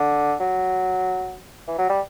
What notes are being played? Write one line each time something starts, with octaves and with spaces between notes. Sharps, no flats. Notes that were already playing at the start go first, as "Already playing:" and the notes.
Already playing: D3
F#3
E3
F#3
G3